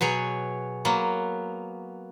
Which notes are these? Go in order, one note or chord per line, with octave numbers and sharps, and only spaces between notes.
B2 F#3 G#4 C#5
F#3 A#3 B3